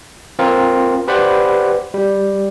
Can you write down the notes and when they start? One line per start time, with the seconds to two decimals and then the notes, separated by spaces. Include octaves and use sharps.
0.39 C4 F4 A#4
1.08 G4 B4 C5 D5 F#5 B5
1.94 G3